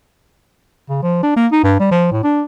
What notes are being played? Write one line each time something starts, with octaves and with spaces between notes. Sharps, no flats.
C#3
F3
D4
A#3
D#4
G2
G3
F3
A2
D4